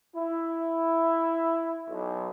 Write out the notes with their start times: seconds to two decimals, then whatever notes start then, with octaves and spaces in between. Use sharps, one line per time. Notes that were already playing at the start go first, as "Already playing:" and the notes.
0.16 E4
1.89 B1